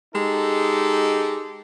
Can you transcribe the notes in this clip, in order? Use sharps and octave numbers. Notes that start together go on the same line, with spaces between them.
G#3 D#4 G4 A4